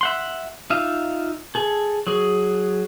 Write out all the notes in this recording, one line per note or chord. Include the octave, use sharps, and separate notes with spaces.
E5 F#5 C6
D#4 F4 E5 F5
G#4 A4
F#3 G#4